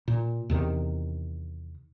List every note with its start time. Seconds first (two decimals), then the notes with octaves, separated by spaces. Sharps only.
0.08 A#2
0.50 E2 C3 D#3